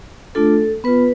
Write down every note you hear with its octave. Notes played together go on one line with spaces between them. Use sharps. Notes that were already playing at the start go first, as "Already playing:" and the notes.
A3 D4 F4 A4
B3 F4 B4